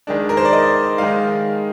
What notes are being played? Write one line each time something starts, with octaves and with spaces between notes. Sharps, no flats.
D#3 G#3 D4
A#4
C5
D5
D#5
D#3 G#3 D#4 F5